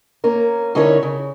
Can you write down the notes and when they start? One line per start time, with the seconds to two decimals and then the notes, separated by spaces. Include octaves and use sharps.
0.24 A#3 C#4 A#4
0.75 D3 C#4 D#4 E4 A#4 C#5
1.03 C#3